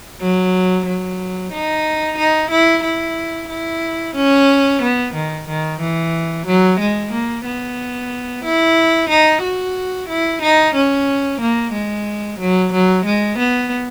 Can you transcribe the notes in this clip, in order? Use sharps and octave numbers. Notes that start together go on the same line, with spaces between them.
F#3
F#3
D#4
D#4
E4
E4
E4
C#4
B3
D#3
D#3
E3
F#3
G#3
A#3
B3
E4
D#4
F#4
E4
D#4
C#4
A#3
G#3
F#3
F#3
G#3
B3